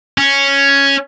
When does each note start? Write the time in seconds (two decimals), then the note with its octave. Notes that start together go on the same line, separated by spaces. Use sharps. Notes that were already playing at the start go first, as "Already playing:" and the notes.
0.18 C#4